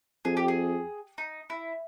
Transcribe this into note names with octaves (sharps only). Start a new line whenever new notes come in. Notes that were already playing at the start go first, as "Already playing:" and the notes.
F2 G#4
G4
G#4
D#4
E4